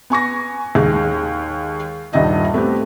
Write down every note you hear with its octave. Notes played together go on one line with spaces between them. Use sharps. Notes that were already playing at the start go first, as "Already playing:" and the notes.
B3 G#5 C#6 A#6
D#2 G#3
D#1 G2 D#3 D#4 D#5 E5
A3 B3 C4 G4